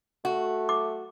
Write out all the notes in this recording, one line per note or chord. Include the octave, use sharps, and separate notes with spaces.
A3 F#4
D6